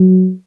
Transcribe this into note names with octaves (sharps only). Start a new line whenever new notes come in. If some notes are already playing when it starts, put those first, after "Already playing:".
Already playing: F#3